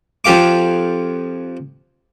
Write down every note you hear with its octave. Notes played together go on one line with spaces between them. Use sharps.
F2 F3 G4 F5 D6